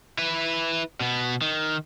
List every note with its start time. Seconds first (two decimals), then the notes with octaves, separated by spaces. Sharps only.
0.18 E4 B4
1.01 B2 B3
1.42 D#3